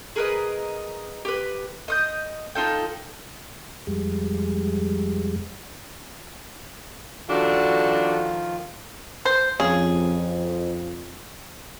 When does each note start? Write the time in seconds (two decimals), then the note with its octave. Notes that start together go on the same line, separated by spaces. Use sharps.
0.16 G#4 A#4 B4 D#5
1.25 G4 B4
1.88 D#5 D#6 G6
2.55 D#4 F4 A4 G5
3.87 F2 G3 G#3
7.29 D#3 F3 G3 D4 F4 F#4 A4
9.25 C5
9.60 F2 C#3 G#4